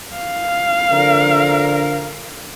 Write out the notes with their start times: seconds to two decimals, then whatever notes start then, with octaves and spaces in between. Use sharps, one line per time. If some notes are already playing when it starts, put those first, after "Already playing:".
0.16 F5
0.92 D3 F3 A#4